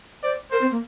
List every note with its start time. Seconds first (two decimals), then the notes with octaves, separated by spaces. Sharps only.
0.23 C5 D5
0.51 A#4 C5
0.61 C4
0.71 A#3